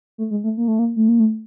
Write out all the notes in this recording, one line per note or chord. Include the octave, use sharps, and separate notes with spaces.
A3
G#3
A3
A#3
A3
A#3
A3
A#3
A3